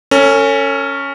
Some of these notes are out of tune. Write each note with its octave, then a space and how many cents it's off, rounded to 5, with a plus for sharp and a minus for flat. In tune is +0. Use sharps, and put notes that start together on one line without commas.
C#4 +0 A4 +45